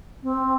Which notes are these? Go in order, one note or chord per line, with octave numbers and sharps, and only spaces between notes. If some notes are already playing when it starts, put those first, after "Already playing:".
C4